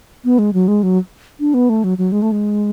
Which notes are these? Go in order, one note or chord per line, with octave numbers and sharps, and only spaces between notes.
B3
G#3
F#3
G#3
F#3
D4
B3
A3
F#3
F#3
G#3
A3
G#3